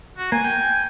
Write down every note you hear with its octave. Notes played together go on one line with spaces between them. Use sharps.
F#4
A#3 G#5
G5